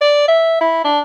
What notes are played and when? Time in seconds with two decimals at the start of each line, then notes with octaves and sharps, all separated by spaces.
0.01 D5
0.28 E5
0.61 E4
0.84 D4